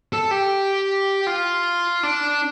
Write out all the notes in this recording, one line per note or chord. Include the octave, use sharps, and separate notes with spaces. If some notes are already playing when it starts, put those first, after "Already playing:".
A4
G4
F4
D4